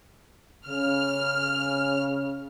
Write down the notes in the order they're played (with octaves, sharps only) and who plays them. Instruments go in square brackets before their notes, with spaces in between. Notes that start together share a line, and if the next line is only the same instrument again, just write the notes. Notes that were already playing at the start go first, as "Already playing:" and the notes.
[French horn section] C#3 [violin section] F6